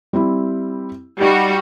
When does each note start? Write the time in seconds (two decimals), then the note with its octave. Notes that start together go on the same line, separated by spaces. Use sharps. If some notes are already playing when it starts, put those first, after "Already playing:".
0.13 G3 C4 E4
1.21 G3 D#4 F#4